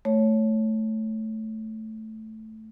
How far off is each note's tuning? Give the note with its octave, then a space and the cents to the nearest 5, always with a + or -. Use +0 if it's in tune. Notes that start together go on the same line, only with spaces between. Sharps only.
A3 +0 C#5 +0